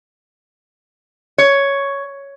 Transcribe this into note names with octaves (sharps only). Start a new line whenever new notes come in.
C#5